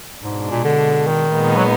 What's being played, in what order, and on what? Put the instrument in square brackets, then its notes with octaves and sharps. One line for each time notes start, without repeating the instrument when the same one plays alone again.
[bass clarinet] G#2 [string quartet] B2 G#3 D4
[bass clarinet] A#2
D3
D#3
[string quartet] A#2 G#3 B3 D#4
[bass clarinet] F#3